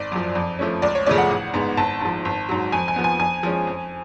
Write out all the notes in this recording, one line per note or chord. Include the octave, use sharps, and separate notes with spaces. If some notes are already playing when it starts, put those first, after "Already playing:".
Already playing: G#1 D5
F#2 F3
F2
F3 A3 C#4
C#2 D5
C#5
C#3 F3 A3 C#4 D5
F#5
A1
G#2 G#3 B3
G#1 A5
G#2 F3
G#1
G#2 F#3
F2 G#5
G#5
F3 B3
G#5
F2 G#5
F3 G#3 C#4
F2